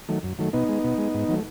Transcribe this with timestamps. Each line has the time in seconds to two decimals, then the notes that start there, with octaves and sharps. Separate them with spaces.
0.09 D#3 F#3 A3
0.23 F#2
0.39 D#3 F#3 A3
0.53 B2 B3 D#4
0.69 G#3
0.84 B2
0.98 G#3
1.14 G#2
1.28 D#3 F#3 A3